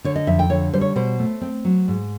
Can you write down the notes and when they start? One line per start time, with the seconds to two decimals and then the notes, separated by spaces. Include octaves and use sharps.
0.04 D3 C#5
0.16 D#5
0.27 F2 E5
0.39 G5
0.50 D3 C#5
0.73 G3 C5
0.81 C#5
0.96 B2 C5
1.19 A3
1.41 C4
1.65 F#3
1.88 G#2